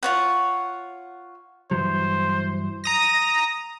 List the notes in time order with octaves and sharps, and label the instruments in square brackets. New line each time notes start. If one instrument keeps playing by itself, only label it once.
[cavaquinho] F4 C#5 F#5
[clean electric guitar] G2 E3 F#3 [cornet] C5
[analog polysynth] A#5 D#6 A#6